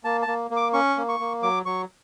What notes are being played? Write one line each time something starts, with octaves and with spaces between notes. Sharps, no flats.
A#3 A5
A5
A#3
A#3
D6
C#4 C#6
A#3
C#6
A#3
F#3 D6
F#3 C#6